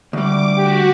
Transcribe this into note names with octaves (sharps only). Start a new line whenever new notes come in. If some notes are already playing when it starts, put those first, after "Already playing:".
D2 G3 D6
F#4 G4